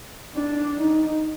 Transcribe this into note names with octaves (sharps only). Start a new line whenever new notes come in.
D4
D#4